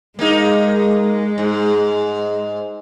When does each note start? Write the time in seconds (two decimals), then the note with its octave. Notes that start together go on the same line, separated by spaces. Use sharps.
0.19 G#3 A#3 D#4 G#4
1.38 G#2